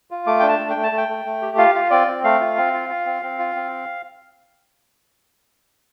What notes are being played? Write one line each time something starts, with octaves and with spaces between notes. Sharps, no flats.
F4
A3 D6
D4 G5
A5
A3
G5
A3
A5
A3
G5
A3
A3
G4
F4 F5
F4
C4 D5
C4
A3 F5
F4
C4
F4
F4
C4
C4
F4
C4